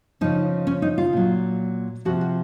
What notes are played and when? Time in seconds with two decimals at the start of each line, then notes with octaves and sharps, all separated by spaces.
0.21 C#3 F3 D#4
0.67 C#4
0.82 D#4
0.98 F4
1.13 A#2 F#3
2.05 C3 F3 F#4
2.21 F#4